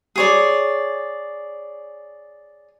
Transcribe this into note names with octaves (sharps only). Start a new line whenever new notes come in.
G#4 C#5 D5